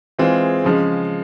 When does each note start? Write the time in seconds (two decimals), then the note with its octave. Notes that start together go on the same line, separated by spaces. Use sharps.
0.19 E3 G#3 C4 F4 G#4
0.64 C#3 F3 G#3